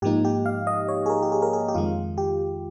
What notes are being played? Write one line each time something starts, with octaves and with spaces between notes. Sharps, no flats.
G#2 F3 A#3 D#4 G4
G4
F5
D#5
C#5
G#4
A#4
G4
G#4
A#4
G#4
G4
F2 D#3 G#3 F4
G4